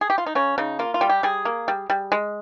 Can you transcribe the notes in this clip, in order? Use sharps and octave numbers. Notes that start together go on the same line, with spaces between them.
G#4
G4
F4
D#4
C#3 C#4
C#3 D#4
A#3 F4
F4
G3
G4
G3 G#4
A#3
G3
G3
G#3